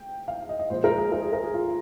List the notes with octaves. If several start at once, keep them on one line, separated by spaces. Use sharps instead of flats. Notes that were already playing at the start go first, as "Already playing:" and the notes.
Already playing: G5
F5
D#5
D#5
A#2 F3 G#3 C5
A#4
G#4
A#4
G#4
A#4
G#4
F4